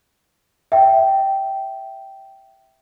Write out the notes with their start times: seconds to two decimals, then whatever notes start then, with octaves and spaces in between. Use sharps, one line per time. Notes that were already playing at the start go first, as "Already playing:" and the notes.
0.72 E5 G5